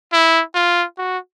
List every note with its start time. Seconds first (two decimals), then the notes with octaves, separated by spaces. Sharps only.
0.13 E4
0.55 F4
0.98 F#4